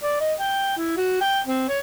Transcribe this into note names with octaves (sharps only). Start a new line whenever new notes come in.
D5
D#5
G5
E4
F#4
G5
C4
C#5